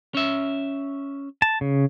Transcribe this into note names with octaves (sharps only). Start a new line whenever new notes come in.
C#4 E5
A5
C#3